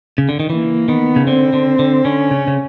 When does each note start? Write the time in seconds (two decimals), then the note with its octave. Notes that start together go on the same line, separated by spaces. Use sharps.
0.18 C#3
0.29 D3
0.40 D#3
0.50 E3 A#3
0.88 D#3 B3
1.16 C#3
1.27 D3 C4
1.53 D3
1.79 D3
2.04 D3 C#4
2.31 C#3
2.48 C#3